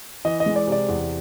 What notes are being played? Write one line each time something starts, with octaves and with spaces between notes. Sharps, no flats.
E3 D#5
D#5
G#3
D5
C3 D5
E2